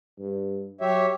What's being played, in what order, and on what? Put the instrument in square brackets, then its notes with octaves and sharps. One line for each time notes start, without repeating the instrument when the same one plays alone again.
[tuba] G2
[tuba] F#3 [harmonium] G4 C#5 E5